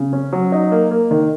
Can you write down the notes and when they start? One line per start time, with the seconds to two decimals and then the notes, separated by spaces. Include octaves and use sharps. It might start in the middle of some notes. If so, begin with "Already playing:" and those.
Already playing: C#3
0.13 C#4
0.32 F#3
0.52 D#4
0.72 A#3
0.91 A#3
1.11 D#3